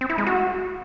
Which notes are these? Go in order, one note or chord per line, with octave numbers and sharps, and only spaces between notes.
C4
E4
G#3
F#4